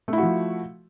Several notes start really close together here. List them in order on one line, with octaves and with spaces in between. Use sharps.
A3 E4 F#4 F3